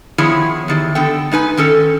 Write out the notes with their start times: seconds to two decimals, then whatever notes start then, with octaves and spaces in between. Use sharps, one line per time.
0.18 D#3 F3 B3 E4 G#4 C#5
0.68 E2 D#3 G4
0.95 D3 B3 A4 G5
1.31 G#3 D#4 B4 G#5
1.57 D#3 C#4 A4